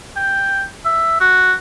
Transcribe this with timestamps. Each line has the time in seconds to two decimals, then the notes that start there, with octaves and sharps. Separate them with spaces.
0.16 G5
0.85 E5
1.20 F#4